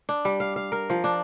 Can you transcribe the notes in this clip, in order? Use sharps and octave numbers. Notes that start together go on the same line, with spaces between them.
D4
G3
F5
F5
A#4
F3
D4